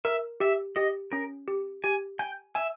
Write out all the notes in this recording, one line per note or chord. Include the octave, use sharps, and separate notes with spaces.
A#4 E5
G4 E5
G4 D#5
C#4 A#4
G4
G4 G#5
G5 G#5
E5 G#5